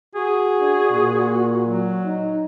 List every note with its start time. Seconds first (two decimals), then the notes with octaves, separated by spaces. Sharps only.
0.15 F#4 G#4
0.58 D4
0.91 A#2
1.64 F#3
2.05 D#4